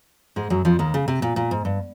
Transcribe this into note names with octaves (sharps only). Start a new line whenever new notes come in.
G#2 G#3
F#2 F#3
F2 F3
D#2 D#3
C#3
C3
A#2
A#2
G#2
G2